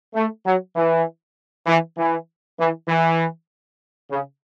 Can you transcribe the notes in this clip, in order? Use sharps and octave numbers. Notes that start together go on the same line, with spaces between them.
A3
F#3
E3
E3
E3
E3
E3
C#3